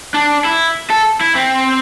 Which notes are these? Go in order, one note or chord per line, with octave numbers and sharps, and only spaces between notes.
D4
E4
A4
E4
C4